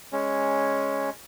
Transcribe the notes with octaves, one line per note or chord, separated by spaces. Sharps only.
G#3 C#4